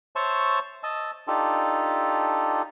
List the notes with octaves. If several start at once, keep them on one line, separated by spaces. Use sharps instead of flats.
C5 C#5 E5 A5 C6 C#6
D#5 A5 E6
D4 D#4 F4 G4 A4